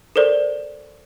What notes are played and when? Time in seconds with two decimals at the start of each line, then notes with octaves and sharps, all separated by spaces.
0.16 A4 A#4 C5 D5